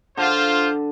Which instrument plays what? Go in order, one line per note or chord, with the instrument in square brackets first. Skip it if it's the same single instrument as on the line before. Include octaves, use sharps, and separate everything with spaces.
[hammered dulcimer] D3 [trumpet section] F4 C5